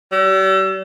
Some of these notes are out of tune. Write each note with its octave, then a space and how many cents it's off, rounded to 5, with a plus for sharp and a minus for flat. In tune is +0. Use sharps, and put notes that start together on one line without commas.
G3 -45